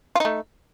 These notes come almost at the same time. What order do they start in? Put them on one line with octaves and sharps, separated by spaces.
F4 D#4 A3